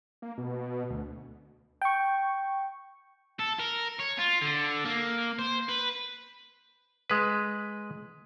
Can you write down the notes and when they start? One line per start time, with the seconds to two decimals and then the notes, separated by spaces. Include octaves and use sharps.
0.22 A#3
0.38 B2
0.90 D2
1.82 G5 C#6
3.40 A4
3.59 A#4
3.99 C#5
4.18 F4
4.41 D3
4.85 A#3
5.39 C5
5.69 B4
7.10 G#3 B4